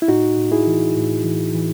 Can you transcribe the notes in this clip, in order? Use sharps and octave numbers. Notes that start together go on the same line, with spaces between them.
E4
A2 D#4 F#4
A2
E4 G#4
E3
A2
E3
E3